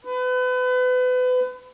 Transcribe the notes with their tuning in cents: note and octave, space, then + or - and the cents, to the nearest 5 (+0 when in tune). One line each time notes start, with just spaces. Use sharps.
B4 +30